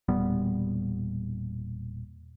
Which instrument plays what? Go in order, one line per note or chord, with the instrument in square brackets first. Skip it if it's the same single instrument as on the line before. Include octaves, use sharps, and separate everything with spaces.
[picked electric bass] E1 A#2 G3 B3